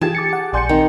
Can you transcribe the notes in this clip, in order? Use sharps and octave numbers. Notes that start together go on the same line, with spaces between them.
E3 F4 G4 G#4 A5 G#6
D6 A6 C#7
F#5
A#1 D5 G#5 C6 G6 C#7
D#3 C4